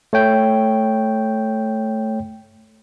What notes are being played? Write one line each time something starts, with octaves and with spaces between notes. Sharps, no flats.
A3 C#5 G5 G6